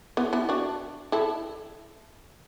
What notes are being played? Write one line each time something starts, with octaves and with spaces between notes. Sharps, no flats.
B3 E4
B3 E4
D4 F#4
E4 A4